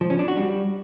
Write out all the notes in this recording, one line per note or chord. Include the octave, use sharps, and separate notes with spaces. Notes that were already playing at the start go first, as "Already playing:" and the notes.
F3
C#4
D4
F#4
G3